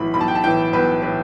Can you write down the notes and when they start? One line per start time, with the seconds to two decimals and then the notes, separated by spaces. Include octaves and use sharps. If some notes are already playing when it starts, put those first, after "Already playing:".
Already playing: B1 A2 E3 B5
0.14 B1 B5
0.21 A5
0.28 G5
0.35 A5
0.44 A2 E3 G5
0.73 B1 B4
1.02 A2 E3 B4